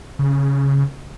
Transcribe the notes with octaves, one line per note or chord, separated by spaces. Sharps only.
C#3